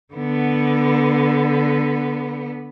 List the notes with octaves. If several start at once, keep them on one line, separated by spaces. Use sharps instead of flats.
D3 B3